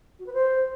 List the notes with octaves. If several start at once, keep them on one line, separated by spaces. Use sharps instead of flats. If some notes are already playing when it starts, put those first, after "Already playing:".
F#4
B4
C5